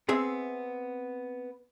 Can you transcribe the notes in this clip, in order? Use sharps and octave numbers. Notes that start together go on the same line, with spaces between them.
B3 C4 G#4 E5